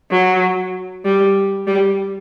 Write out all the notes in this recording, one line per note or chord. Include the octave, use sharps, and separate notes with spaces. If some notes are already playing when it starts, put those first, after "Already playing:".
F#3
G3
G3